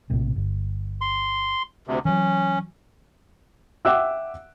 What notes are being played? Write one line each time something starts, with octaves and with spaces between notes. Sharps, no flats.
A#1 A2 C3
G1
C6
D2 C3
E3 F#3 C#4
E5 F#5 G5 D6 E6 F#6